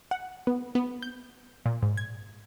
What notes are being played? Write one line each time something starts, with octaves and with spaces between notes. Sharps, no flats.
F#5
B3
B3
G6
A#2
G#2
G#6